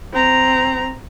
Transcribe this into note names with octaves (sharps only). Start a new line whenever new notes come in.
C4 A#5